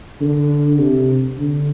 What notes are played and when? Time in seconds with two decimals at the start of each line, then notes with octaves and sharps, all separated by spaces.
0.21 D3
0.79 C3
1.38 D3